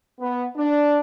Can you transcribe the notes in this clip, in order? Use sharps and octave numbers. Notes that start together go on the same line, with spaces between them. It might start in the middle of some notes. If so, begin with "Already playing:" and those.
B3
D4